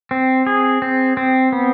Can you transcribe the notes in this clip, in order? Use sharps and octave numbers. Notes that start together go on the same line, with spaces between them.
C4
G#4
C4
C4
B3